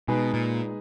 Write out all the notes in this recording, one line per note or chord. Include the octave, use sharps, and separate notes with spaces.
B2 G#3 D#4 G#4 B4
A#2